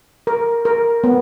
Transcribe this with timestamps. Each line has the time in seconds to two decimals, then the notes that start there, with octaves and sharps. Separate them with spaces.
0.27 A#4
0.65 A#4
1.04 B3